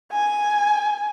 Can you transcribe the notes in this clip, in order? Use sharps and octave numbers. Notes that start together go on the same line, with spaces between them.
G#5